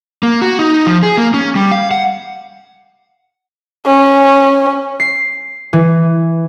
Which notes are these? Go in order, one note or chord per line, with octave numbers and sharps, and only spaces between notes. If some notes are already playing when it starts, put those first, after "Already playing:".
A#3
F#4
D#4
F3
G#4
A#3
C#4
G3
F5
F#5
C#4
C7
E3